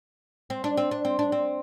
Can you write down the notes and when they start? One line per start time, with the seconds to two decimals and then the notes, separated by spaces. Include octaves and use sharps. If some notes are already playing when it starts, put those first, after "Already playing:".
0.50 C4
0.64 D4
0.77 C4
0.91 D4
1.05 C4
1.19 D4
1.32 C4